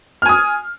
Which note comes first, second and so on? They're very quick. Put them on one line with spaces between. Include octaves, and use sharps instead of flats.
F6 G#5 D#6